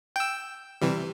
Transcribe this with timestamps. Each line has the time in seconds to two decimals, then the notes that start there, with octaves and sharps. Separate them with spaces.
0.16 G5 E6
0.82 C3 E3 G3